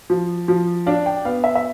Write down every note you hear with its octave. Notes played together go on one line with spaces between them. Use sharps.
F3
F3
D4 F5
G5
B3 F5
E5
E5